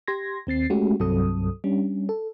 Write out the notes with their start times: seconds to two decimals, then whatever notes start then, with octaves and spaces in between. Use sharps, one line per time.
0.08 G4 C6 G#6 A#6
0.47 D#2 C4 A6 C7
0.70 G#3 A3 C#4 F#4 G4
1.00 C2 G2 F#3 C4 A4 D#6
1.64 G3 C#4 D4
2.09 A4